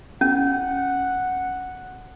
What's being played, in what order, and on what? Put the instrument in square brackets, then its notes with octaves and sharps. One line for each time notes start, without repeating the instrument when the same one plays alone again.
[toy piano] C#4 [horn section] F#5